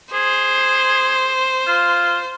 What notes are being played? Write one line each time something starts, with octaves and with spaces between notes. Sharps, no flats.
G#4 C5
F4